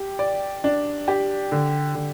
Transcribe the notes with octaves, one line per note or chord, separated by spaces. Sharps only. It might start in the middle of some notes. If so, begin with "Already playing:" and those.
Already playing: G4
D5
D4
G4
D3
D3